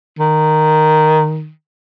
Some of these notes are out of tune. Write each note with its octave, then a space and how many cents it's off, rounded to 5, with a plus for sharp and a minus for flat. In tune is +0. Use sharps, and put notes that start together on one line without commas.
D#3 -5